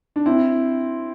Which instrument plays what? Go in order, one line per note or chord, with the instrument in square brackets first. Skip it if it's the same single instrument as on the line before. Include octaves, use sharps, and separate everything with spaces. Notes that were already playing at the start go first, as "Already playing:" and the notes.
[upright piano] D4
C4 E4